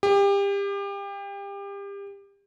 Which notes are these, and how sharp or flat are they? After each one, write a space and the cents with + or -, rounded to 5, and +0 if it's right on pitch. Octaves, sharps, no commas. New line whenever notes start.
G4 +30